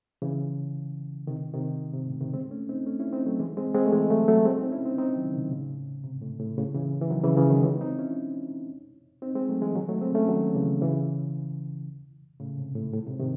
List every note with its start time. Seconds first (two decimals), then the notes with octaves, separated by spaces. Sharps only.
0.22 C#3 E3
1.27 C3 D#3
1.54 C3 D#3
1.94 G#2 C3
2.07 A2 C#3
2.20 C3 D#3
2.34 G#3 C4
2.51 A3 C#4
2.69 C4 D#4
2.86 A3 C#4
3.00 C#4 E4
3.13 C4 D#4
3.26 F#3 A3
3.40 E3 G#3
3.57 G#3 C4
3.75 G#3 C4
3.86 A3
3.92 E3 G#3
4.10 F#3 A3
4.28 F#3 A3
4.45 G#3 C4
4.58 C4 D#4
4.72 C#4 E4
4.85 C4 D#4
4.98 C4 D#4
5.16 D#3 F#3
5.26 C#3
5.33 C3 D#3
5.51 A2 C#3
6.04 G#2 C3
6.22 A2
6.40 A2
6.58 A2 C#3
6.75 C#3 E3
7.01 E3
7.10 D#3 F#3
7.23 C#3 E3
7.37 C#3 E3
7.50 D#3 F#3
7.63 E3 G#3
7.81 C4 D#4
7.99 C#4 E4
9.22 C4 D#4
9.35 G#3 C4
9.49 F#3 A3
9.62 E3 G#3
9.75 D#3 F#3
9.88 F#3 A3
10.01 G#3 C4
10.15 A3 C#4
10.28 D#3 F#3
10.55 C#3 E3
10.81 C#3 E3
12.40 A2 C#3
12.58 G#2 C3
12.75 A2
12.93 A2
13.06 G#2 C3
13.20 C3 D#3